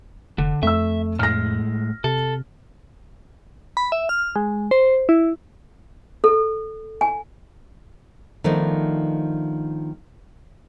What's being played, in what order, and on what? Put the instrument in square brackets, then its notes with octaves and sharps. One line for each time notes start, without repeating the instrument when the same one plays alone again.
[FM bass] F1 [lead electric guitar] D3
[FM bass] F2 [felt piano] A3 E6 [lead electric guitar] E5
[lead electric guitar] A2 G#3 [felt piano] F6 A#6
[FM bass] C3 [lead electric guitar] A4
[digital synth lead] B5
E5
F6
G#3
C5
E4
[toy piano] A4
G#5
[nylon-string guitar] D#3 F3 A3 B3 D4 D#4